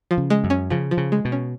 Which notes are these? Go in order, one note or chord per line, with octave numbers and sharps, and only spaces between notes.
F3
C#3
G#3
F#2
C#4
C#3 F3
F3
C#3
G#3
B2
C#4